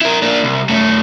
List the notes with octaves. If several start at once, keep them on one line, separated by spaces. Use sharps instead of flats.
E4 A#4
A#3 D4
C2
F#2 A3